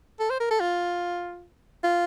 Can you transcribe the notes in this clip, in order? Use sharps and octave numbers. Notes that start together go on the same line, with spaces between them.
A4
C5
A#4
A4
F4
F4